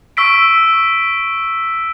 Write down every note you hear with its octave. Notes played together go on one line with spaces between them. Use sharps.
C#6 E6 B6 D7